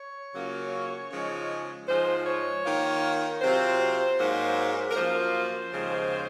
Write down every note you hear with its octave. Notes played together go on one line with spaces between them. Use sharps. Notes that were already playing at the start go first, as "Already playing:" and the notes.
Already playing: C#5
C#3 F#3 A#3 C#4 F4
C#3 F3 G#3 D#4
G#2 F3 G#3 C5
C#5
D#3 A#3 F4
C3 F#3 C4 F4 C5
G#2 F#3 A#3
A#4
F#2 F3 A#3 F4 C5
D#2 C#3 F3 G#3